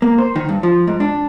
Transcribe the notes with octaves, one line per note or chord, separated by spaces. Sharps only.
A#3
C5
D#3
G2
F3
G#2
D4